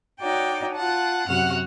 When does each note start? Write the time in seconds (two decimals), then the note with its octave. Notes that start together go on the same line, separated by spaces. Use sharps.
0.20 D#4 F#4 C#5 D5 G5
0.75 F4 F#5 A5
1.29 F#2 C3 F#4 F#5 F6